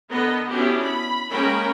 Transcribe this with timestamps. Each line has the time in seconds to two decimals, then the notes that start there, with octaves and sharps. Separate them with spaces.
0.11 D3 B3 A#4 D#5
0.49 B3 C#4 D4 E4 F#4 G4
0.85 B5
1.30 G#3 A#3 C#4 A#4 G5 B5